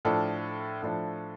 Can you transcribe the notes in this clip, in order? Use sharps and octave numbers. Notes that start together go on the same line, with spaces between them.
A2 F3 D4 A4
A2 F3 D4